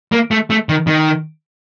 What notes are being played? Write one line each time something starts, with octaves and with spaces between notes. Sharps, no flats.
A#3
A3
A3
D#3
D#3